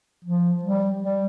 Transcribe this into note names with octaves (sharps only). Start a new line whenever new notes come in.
F3
G3
G3